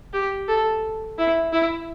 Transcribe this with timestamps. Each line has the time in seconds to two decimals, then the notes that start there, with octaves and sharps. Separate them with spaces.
0.13 G4
0.48 A4
1.18 E4
1.53 E4